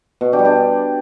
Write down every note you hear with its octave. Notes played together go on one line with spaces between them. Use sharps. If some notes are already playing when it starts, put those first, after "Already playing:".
B2
D4 G4
G3
D4 G4